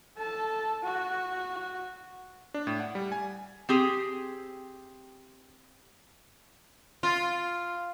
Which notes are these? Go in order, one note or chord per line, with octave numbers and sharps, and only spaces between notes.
A4 A5
F#4
D4
A2
F#5
G3
G#5
C4 G4 G#4
F4